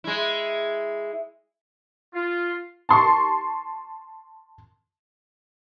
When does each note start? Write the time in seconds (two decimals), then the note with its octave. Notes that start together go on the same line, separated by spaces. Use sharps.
0.04 G#3 E4
2.15 F4
2.89 A5 C6 C#6